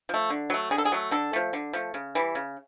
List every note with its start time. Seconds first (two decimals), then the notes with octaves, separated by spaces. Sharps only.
0.09 F3 A3
0.30 D3
0.50 F#3 A3
0.71 D3 G#4
0.78 A4
0.85 G#4
0.92 F#3 A3
1.11 D3 A4
1.33 F3 A3
1.53 D3
1.73 F3 A3
1.94 C#3
2.15 E3 G3
2.35 C#3